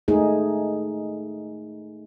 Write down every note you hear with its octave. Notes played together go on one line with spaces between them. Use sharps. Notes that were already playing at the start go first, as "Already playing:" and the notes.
A3 D#4 G#4